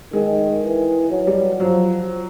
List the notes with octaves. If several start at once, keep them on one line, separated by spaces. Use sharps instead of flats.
D#3 G#3
E3
F#3
G3
F3 F#3